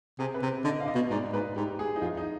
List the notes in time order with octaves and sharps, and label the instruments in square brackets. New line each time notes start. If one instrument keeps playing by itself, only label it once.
[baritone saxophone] C3 [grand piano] G#4
[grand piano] B4
[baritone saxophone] C3
[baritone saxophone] D3 [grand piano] D#5
[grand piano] F5
D#5
[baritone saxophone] B2
[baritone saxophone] G#2 [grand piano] D5
[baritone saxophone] G#2 [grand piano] B4
[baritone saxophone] G#2 [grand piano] G4
[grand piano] G#4
D#4
[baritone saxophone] F2 [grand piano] F4
[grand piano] D#4